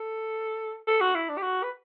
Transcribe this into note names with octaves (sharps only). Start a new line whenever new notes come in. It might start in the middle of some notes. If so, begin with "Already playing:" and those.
Already playing: A4
A4
F#4
E4
D4
G4
F#4
B4